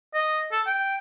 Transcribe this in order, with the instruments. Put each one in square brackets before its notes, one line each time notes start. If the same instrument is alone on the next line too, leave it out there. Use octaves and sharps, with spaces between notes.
[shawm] D#5
A4
G5